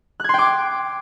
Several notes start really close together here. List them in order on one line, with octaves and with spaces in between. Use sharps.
F#6 G#6 C6 G5 D6